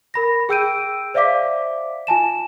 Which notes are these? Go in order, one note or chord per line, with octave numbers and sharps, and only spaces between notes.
A#4 B5 A#6
G#4 G5 E6 G6 D7 D#7
C5 D5 E5 F5 D6 B6
F4 G#5 A5 E7